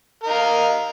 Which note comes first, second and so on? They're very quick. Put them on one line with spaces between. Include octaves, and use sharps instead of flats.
A#4 D#5 F5